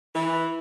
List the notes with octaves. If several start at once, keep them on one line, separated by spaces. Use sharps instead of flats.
E3